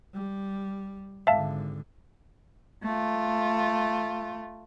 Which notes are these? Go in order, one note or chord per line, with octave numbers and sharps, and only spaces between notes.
G3
G#1 D3 E5 F5 A5
A3 F4